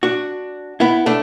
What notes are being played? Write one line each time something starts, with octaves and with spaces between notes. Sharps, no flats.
D4 F#4
B3 E4
A3 D4